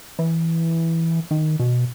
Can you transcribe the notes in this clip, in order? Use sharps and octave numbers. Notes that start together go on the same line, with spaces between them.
E3
D#3
B2